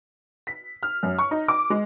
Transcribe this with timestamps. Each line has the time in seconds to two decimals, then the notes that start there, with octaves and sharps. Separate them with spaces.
0.47 B6
0.83 F6
1.03 F#2
1.18 C#6
1.31 D#4
1.48 D6
1.70 G#3